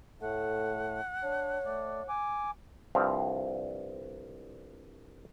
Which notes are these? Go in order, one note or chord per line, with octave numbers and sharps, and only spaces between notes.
A2 A3 A4 F#5
D4 C#5
A3 D5
G#5 D6
C2 G2 F3 C4 F5